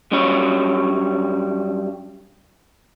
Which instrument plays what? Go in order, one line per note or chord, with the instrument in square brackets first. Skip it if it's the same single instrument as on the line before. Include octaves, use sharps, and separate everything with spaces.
[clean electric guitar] G2 F#3 G3 C#4 C#5 B5